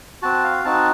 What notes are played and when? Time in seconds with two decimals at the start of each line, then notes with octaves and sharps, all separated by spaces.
0.22 C4 F#4 A5
0.44 F5
0.65 C4 D#4 F#4 A5